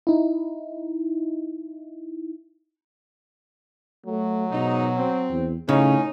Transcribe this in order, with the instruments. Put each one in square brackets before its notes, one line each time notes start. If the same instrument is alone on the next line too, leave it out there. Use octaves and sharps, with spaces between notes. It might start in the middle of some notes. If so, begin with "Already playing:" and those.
[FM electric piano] D#4 E4
[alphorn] F#3 [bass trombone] A3
[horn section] G#2 D#4 [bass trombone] B2
[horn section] C4
[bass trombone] E2
[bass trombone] A2 [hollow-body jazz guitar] C#3 [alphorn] C#4 [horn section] D#4